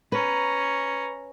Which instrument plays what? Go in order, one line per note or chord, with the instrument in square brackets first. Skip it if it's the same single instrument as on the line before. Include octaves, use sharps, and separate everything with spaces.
[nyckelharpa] C#4 A#5 [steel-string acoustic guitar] B4